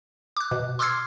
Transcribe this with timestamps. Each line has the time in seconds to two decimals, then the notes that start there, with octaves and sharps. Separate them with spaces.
0.37 D6 F#6
0.51 B2
0.79 C6 D6 E6 F6 G#6 C7